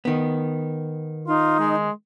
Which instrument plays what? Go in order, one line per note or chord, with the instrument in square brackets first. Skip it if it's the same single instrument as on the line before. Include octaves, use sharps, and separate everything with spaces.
[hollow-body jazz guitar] D#3 B3
[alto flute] D#4 [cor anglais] F4
[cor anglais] G#3